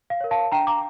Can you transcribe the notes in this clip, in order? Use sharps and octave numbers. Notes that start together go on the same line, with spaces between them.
F5
A#4 C#5
F5 A5
D4 G5 A#5
A#5 D6